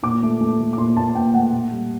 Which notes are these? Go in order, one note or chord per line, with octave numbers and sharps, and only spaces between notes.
A#2 D6
A3
A3
A3
D6
A#2 C6
A#2 A5
A5
A#2 G5
A3 F#5
A#2
G3